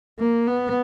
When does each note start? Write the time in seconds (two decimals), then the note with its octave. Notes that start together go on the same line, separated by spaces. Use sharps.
0.19 A#3
0.47 B3